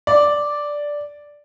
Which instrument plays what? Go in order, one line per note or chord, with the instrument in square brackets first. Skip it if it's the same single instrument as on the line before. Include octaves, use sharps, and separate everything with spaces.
[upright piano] D5